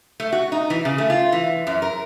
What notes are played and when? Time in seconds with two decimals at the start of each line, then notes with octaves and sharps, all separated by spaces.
0.20 A3
0.32 F#4
0.52 D#4
0.70 E3
0.85 C#3
0.98 A3
1.10 F4
1.32 E3
1.67 F#2
1.82 A#4